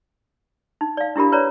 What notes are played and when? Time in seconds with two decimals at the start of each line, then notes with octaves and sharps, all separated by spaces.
0.81 D#4
0.97 D5 F5
1.16 D4 E4 G4 A#4 B5
1.32 B4 C#5 D5 A#5